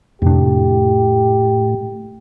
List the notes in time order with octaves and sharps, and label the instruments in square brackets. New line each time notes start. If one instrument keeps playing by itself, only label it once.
[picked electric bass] F2 C3 D4 [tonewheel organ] A2 [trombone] G4